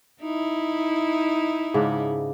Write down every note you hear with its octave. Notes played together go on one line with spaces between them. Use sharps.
D#4 E4
G#2 C#3 D4